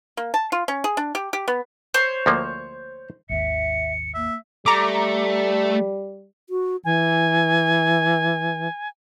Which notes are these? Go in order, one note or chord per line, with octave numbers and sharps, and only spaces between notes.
A#3
A5
F4
C#4
G#4
D4
G4
G4
B3
C5 C#5
D2 F3 A#3
G#1 D#2 D#3 E5 C#7
A#3 E5
G3 A3 A#5 D6
F#4
E3 G#5